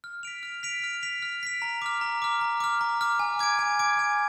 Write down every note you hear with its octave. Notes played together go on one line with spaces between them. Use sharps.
F6
B6 D7 F7
F6
B6 D7 F7
F6
B6 D7 F7
F6
B6 D7 F7
A#5
D6 F6
A#5
D6 F6
A#5
D6 F6
A#5
D6 F6
G#5
D6 G#6 D7
G#5
D6 G#6 D7
G#5